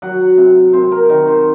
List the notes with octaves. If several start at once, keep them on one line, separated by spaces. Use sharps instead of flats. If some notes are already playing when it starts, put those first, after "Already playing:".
F#3 F#5
C3
C3 C5
A#4
D#3 C#5
C5